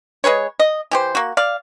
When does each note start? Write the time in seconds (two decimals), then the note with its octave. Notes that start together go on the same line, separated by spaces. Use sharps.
0.24 G#3 G#4 B4 C#5
0.59 D#5
0.91 E3 G4 C5
1.15 A#3 F#4
1.37 D5 F5